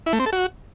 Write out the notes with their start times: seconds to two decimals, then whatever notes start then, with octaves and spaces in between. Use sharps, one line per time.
0.06 E4
0.13 A3
0.20 C4
0.26 A4
0.33 F#4